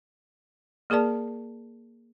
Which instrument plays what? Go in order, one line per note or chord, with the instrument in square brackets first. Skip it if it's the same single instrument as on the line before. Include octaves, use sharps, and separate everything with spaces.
[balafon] A#3 G#4 A#4 D5 A5